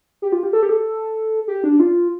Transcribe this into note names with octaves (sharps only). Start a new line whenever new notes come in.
G4
F4
G4
A4
G4
A4
G4
D4
F4